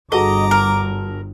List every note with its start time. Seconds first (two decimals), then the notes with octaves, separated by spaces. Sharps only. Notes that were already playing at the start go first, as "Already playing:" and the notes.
0.12 G1 G2 F#4 G#4 A4 D#5 A#5 D6
0.51 A#4